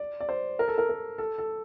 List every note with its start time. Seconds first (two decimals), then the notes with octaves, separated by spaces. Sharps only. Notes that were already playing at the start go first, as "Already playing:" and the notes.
Already playing: D5
0.21 D5
0.29 C5
0.59 A#4
0.68 A4
0.78 A#4
0.89 A#4
1.18 A4
1.38 A4